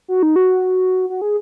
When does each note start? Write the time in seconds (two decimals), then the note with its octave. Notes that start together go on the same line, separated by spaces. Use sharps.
0.08 F#4
0.23 D#4
0.36 F#4
1.10 F#4
1.22 G#4